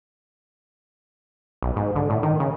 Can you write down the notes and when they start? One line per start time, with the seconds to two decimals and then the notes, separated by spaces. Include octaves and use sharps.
1.62 B1
1.76 G#2
1.96 D3
2.10 A2
2.23 D#3
2.40 C#3